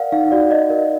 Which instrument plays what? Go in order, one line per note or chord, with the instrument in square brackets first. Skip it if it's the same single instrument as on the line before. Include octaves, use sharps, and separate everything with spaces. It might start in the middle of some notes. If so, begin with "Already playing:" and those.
Already playing: [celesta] A#4 D5 F5 F#5
D#4 F5
F#4 D5
D5 D#5
A#4